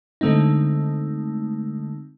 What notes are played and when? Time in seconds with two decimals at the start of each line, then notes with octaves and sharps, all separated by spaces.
0.21 D3 G#3 A3 C4 D#4